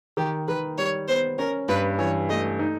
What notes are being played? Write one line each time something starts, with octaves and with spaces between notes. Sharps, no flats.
D#3 G4
D#3 B4
G3 C#5
B3 C5
C#4 A#4
G2 B4
E3 C#5
A3 D#5
D#4